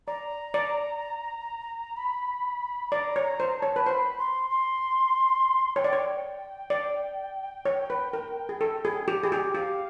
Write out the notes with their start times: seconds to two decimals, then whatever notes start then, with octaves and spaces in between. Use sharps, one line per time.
0.07 D5 A#5
0.54 D5
1.96 B5
2.91 D5 A#5
3.16 C#5
3.23 A#5
3.40 C5
3.55 A#5
3.60 C#5 A5
3.76 B4
3.86 C5 B5
4.18 C6
4.50 C6
5.76 C#5 G5
5.84 D5
5.93 C#5
6.70 D5
7.65 C#5
7.90 B4
8.13 A#4
8.49 G#4
8.61 A4
8.85 G#4
9.08 G4
9.24 G#4
9.32 G4
9.55 G4 F5